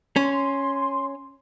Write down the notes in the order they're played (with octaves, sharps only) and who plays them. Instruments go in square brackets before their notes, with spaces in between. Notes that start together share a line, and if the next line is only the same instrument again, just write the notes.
[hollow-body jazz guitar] C#4 [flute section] C6